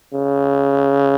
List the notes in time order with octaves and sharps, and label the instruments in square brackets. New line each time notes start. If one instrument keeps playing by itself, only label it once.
[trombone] C#3